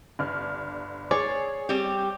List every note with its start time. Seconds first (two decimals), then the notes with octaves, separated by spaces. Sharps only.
0.19 G1 D4 F6
1.11 G#4 C#5 D5
1.69 G3 C4 G4